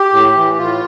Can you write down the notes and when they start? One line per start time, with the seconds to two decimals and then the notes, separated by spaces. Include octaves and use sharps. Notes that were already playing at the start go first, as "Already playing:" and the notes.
Already playing: G4
0.13 A2
0.36 E3
0.58 A2 F4